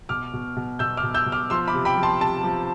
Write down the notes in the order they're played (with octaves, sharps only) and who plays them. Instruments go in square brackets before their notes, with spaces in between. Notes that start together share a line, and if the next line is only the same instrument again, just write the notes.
[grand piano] B2 D6 F6
B2
B2
B2 E6 G6
D6 F6
B2
E6 G6
B2
D6 F6
F3 C6 E6
B5 D6
C3
G5 B5
F3
A5 C6
C3 A5
F3